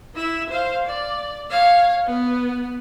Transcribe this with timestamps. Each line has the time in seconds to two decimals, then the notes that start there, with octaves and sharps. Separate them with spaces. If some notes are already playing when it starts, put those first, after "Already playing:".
0.15 E4 E5
0.50 C5 F5
0.86 D5
1.50 C#5 F5
2.06 B3